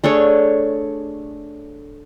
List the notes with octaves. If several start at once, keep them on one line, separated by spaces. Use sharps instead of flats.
A3 D4 G#4 C#5